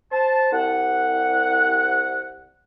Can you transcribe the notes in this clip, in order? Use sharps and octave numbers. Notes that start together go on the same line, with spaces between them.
C5 A5
C2 F#5